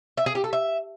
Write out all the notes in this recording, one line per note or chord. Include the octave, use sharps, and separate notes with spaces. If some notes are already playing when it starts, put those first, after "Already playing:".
E5
G#4
G4
A4
E5